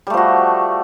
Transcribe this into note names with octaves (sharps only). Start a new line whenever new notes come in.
F3 G3 A3 F#4